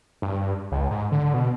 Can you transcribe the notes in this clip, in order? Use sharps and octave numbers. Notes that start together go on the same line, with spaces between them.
G2
C#2
G#2
D3
B2